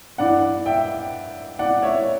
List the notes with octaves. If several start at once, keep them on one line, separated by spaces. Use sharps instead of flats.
G2 E3 D5 F#5
E5 G5
D5 F#5
C#5 E5